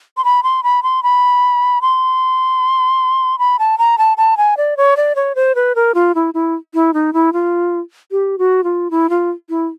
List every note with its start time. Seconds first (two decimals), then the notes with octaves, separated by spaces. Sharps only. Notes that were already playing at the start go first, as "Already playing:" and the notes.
0.17 C6
0.24 B5
0.43 C6
0.63 B5
0.83 C6
1.03 B5
1.81 C6
3.39 B5
3.59 A5
3.78 A#5
3.98 A5
4.18 A5
4.37 G#5
4.57 D5
4.77 C#5
4.97 D5
5.16 C#5
5.36 C5
5.55 B4
5.75 A#4
5.95 F4
6.15 E4
6.34 E4
6.74 E4
6.94 D#4
7.13 E4
7.33 F4
8.11 G4
8.38 F#4
8.64 F4
8.91 E4
9.10 F4
9.49 E4